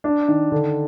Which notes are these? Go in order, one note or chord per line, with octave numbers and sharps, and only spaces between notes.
D4
D#3
D3